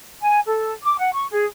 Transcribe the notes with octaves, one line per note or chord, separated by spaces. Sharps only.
G#5
A4
D6
F#5
C#6
G#4